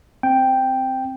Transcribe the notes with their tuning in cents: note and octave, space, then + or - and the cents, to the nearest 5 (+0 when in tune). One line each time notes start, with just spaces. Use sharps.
C4 +0 G5 +0